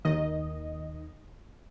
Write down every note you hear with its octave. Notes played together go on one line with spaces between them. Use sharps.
D#2 D#3 D#5